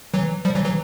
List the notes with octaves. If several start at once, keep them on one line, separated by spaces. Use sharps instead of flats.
E3 F#3
F3 G3
E3 F#3
E3 F#3